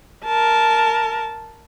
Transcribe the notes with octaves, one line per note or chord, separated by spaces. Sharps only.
A#4 A5